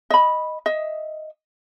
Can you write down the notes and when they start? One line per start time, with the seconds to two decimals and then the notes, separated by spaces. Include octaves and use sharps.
0.10 D#5 B5
0.66 D#5 E5